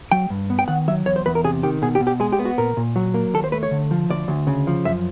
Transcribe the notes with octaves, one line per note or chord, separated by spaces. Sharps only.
F#3 G5
G2
B3
G5
D#3 F#5
F#3 E5
E2 C#5
C5
E2 B4
A#4
C3 G#4
D#3 G4
B2 G#4
G4
B2
G4
G#3 G#4
G4
B3
F#4
A#2 A#4
A#2
F#3
A#3
D#2 A4
C5
A3 B4
C#5
D3
F3
D2 D5
D2
C#3
F3
F#2 E5